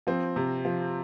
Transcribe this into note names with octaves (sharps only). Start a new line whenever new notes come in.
F3 C4
C3
F3